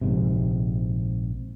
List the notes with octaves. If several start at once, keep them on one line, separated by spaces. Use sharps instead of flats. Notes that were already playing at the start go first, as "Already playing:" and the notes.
A#1 G#2 C3